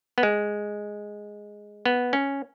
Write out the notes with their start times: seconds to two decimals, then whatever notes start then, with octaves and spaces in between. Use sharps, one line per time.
0.18 B3
0.23 G#3
1.86 B3
2.13 C#4